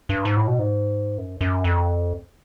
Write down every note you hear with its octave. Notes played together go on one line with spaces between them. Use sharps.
G2
G#2
A2
B2
G#2
F#2
F#2
F2